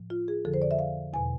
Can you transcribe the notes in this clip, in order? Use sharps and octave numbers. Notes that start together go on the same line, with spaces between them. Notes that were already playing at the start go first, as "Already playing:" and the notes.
Already playing: A2 F3
F4
G#4
F2 D3 F3 A4
C5
D5
E5
F5
E2 B2 G#5